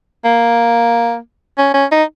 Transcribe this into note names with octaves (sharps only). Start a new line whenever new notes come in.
A#3
C#4
C#4
D#4